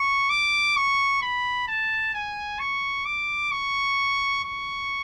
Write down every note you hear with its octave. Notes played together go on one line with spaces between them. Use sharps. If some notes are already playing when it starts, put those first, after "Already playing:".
Already playing: C#6
D6
C#6
B5
A5
G#5
C#6
D6
C#6
C#6